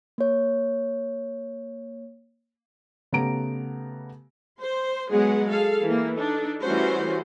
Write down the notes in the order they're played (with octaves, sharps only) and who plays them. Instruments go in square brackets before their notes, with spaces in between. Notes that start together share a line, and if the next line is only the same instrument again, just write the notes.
[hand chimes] A#3 C#5
[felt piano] C#3 A3 B3 G4 A#5 D7
[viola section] C5
F#3 G#3 B3 G#4 F#5
G#4 A4 F5
E3 A#3
D4 D#4 A4
E3 G3 A3 C#4 F#4 C5